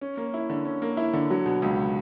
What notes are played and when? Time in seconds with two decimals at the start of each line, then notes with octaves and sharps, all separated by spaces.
0.01 C#4
0.17 A#3
0.34 E4
0.50 D3
0.65 C#4
0.82 A#3
0.97 E4
1.13 D3
1.30 F#3
1.46 B2
1.62 C#2